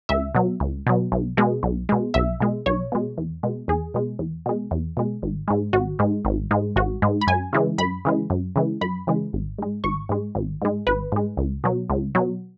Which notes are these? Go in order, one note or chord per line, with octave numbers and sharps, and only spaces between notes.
C#2 E5
B2 F#3
C#2
B2 F#3
B1
B2 G#3
B1
B2 G#3
B1 E5
B2 G#3
B1 C#5
B2 G#3
E2
B2 G#3
E2 G#4
B2 G#3
E2
B2 G#3
E2
B2 G#3
G#1
G#2 G#3
G#1 F#4
G#2 G#3
G#1
G#2 G#3
G#1 F#4
G#2 G#3
B5
F#2 G#5
C#3 E3 G#3
F#2 B5
C#3 E3 G#3
F#2
C#3 E3 G#3
F#2 B5
C#3 E3 G#3
G#1
G#2 G#3
G#1 C#6
G#2 G#3
G#1
G#2 G#3
G#1 B4
G#2 G#3
C#2
B2 F#3
C#2
B2 F#3